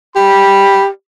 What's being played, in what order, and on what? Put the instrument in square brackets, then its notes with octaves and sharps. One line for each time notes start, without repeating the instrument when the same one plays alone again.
[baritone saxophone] G4 [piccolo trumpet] B5